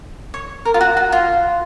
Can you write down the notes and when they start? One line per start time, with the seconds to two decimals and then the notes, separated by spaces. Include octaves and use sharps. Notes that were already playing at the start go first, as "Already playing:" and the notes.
0.34 C#5
0.65 A#4
0.74 F4
0.81 F#4
0.97 F#4
1.12 F4